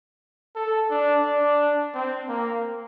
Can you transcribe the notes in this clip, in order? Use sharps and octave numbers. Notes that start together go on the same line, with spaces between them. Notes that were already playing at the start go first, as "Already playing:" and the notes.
A4
D4
D4
C4
A#3